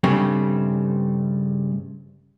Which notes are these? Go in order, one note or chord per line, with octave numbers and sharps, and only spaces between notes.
G2 C#3 G3 A3 C4